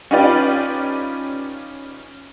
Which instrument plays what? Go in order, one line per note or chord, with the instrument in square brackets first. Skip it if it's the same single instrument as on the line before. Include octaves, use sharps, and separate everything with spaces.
[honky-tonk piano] C#4 D#4 F4 G4 B4 D5